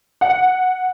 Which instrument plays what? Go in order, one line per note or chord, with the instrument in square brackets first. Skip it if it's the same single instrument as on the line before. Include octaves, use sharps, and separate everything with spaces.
[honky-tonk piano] F#5